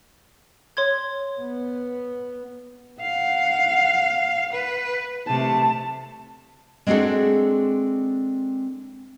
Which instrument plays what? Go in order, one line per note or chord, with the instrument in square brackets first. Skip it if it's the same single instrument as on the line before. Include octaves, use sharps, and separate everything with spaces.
[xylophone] C#5 C6 G#6
[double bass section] B3
[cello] F5 [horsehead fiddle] F#5
[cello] B4
[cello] C3 A3 [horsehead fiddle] A5
[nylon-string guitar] G#3 C4 D4 F#4 G#4 A4